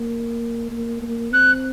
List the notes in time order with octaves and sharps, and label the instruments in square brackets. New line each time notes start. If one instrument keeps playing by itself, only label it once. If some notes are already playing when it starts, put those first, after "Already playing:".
Already playing: [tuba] A#3
A#3
A#3
[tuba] C4 [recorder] F#6